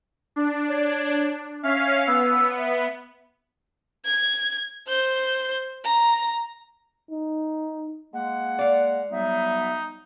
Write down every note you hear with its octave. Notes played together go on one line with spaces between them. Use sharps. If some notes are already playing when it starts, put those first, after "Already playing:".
D4
C#5
C#4 E5 F5
B3 E6
E5
G#6
C5 G6
A#5
D#4
G#3 A#3 F#5
D5 F5
F#3 G3 B3 D#4 E5